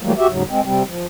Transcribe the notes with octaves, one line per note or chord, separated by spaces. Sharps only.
E3 F#3 G3 A3 A#3
F#4 G4 E5
D#2 G#2 C#3 F#3
G#3 C4
C3 G3 C4
F3